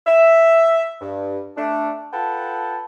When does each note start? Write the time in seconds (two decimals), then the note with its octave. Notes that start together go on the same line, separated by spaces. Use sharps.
0.07 E5
1.01 G2
1.57 A3 D4
2.13 F4 A4 B4 F#5 G5 A5